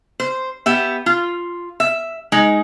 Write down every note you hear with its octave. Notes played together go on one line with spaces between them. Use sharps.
C5
B3 G4 E5
F4
E5
G#3 D#4